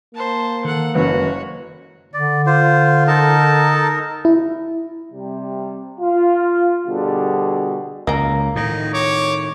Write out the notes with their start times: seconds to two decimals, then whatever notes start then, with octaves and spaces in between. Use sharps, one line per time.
0.14 A#3 C5 A5
0.65 D#3 A4 F#5
0.95 F#1 F#2 F#4 B4 C#5
2.14 D3 D5
2.46 F4 C5
3.07 D#4 A4 A#4 A5
4.25 E4
5.12 C3 G3
5.99 F4
6.86 B2 D3 G3 F#4 G#4
8.07 C#2 A#3 A#5
8.56 A2 D#3 D#4
8.94 C#5 D6